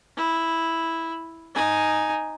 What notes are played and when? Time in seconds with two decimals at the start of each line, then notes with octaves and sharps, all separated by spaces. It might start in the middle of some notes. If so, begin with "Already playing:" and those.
0.17 E4
1.55 D#4 G#5